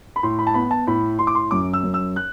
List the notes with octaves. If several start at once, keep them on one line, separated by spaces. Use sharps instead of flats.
B5
A2 C6
B5
A5
B3 B5
A5
A2 B5
A2 C6
D6
C6
F#2 D6
E6
F#2
E6
F#6